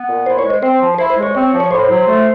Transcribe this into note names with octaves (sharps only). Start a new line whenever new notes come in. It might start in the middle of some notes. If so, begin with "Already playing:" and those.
Already playing: B3
A#2
E4 C5
C#5
G#3
C5
C4 C5
F3
E4 C5
C5
G#3
C#5
C4 C#5
F3
C#5
A2 C5
F#3
A3